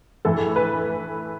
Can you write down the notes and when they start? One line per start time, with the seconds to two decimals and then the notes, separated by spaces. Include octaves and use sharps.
0.25 A2 E3 A4
0.56 B4